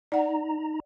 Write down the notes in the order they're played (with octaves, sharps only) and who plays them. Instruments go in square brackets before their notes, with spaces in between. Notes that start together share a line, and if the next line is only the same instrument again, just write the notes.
[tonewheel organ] D#4 A#5 [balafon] D5 F#5